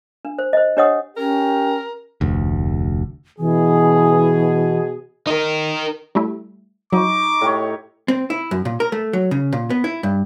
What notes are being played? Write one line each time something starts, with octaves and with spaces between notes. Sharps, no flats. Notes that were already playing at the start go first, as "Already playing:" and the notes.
D4
C5
C5 D#5
D4 G4 C#5 D#5 F#5 D#6
C#4 G4 A#4
F1 D2
B2 E3 G#4
D#4 A#4
G3 A3 E4
F#3 D#4 C#6 D6
A2 G4 C#5
C4
E4
F#2
A#2
A#4
A3
F#3
C#3
A#2
B3
E4
G2